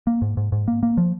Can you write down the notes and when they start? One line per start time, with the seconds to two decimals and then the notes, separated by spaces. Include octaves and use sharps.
0.07 A#3
0.22 G#2
0.37 G#2
0.52 G#2
0.68 A#3
0.83 A#3
0.97 F3